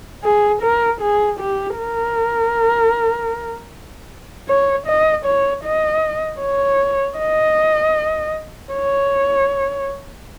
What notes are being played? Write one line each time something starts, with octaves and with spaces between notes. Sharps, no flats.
G#4
A#4
G#4
G4
A#4
C#5
D#5
C#5
D#5
C#5
D#5
C#5